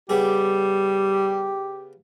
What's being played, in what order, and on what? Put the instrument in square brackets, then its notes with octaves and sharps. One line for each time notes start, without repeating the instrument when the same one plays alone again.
[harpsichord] C#3 B3 G#4 [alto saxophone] G3 [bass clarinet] G4